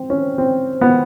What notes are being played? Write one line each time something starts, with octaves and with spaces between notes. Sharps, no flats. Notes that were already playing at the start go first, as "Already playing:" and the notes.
Already playing: C4
C#4
C4
B3